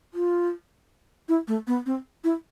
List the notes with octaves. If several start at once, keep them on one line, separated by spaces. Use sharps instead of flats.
F4
E4
A3
B3
C4
E4